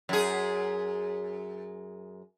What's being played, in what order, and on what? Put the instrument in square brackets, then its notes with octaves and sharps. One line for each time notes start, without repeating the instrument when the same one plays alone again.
[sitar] F#2 G#4